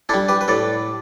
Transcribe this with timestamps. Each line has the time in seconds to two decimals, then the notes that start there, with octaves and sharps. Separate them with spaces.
0.09 G3 D4 E4 A4
0.28 G4 B4
0.41 B4
0.48 A2 A4 D5